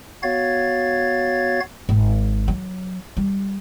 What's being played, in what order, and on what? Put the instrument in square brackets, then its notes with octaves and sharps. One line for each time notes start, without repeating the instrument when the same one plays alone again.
[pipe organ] B3 F#4 C#5 F5 G#6 A6
[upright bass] G#1
F#3
G3